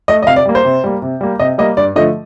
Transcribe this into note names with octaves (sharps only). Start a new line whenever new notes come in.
A3 D#5
D#5
C3 F5
D5
G3 A#3
C5
C3
G3 A#3
C3
G3 A#3
C3 D#5
G3 A#3 D#5
G2 D5
D3 F3 A3 D#5